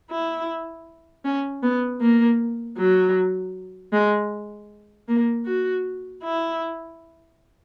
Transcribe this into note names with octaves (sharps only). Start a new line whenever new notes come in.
E4
C#4
B3
A#3
F#3
G#3
A#3
F#4
E4